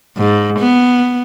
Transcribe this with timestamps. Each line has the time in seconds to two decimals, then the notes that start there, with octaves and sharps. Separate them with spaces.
0.17 G#2
0.59 B3